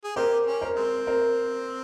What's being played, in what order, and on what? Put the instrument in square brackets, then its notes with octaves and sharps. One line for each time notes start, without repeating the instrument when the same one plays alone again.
[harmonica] G#4
[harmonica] A#3 C4 G4 [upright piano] A#4 C5
[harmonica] C#4
[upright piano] A#4 C5
[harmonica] G#3 C4
[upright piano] A#4 C5